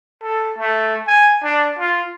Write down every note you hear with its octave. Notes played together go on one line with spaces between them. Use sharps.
A4
A3
G#5
D4
F4